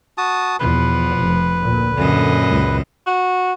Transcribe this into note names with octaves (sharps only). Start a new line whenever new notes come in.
F#4 A5 D#6
E2 B2 F3 B4
F1
D2 A#2
F#2 A#2 D3 D#5
C#2
F#4